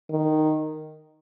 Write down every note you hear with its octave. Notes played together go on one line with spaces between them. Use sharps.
D#3